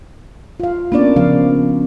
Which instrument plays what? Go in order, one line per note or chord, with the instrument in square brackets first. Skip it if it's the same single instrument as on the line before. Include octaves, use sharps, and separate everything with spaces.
[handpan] F4 F5
[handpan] A#3 D4 D5 [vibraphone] B3 C#4
[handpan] C#3 F3 F5